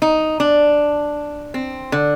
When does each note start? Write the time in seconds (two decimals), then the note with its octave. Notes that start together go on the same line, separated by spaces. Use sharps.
0.02 D#4
0.40 D4
1.54 C4
1.92 D3